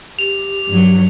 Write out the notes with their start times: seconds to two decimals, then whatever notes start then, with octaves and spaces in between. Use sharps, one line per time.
0.19 G4 F7
0.67 G2 F#3